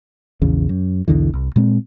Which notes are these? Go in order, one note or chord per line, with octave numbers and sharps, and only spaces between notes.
A#1 E2 C#3
F#2
B1 E2 D3 E3
C2
A#2 G#3 C4